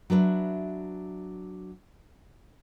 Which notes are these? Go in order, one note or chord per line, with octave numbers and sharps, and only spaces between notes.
F#3 D4 B4 E5